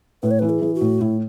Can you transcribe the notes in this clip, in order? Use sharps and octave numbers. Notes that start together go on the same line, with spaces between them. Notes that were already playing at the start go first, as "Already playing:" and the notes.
A2 B4
C#5
E3 B4
G#4
E3
F#4
A2
A2 E4